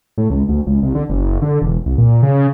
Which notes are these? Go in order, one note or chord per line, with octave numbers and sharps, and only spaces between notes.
A2
C#2
D2
C#2
C2
D3
F#1
D3
E1
C2
A#2
C#3